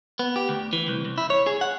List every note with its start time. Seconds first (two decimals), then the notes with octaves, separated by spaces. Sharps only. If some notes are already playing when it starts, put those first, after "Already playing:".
0.19 B3
0.36 G4
0.49 D2
0.73 E3
0.88 C2
1.05 C2
1.18 E4
1.30 C#5
1.47 G#4
1.61 F#5